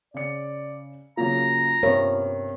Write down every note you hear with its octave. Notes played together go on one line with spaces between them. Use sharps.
C#3 D5 C#7
C#3 F#3 A#3 F4 A#5
G2 C3 B3 A#4 C#5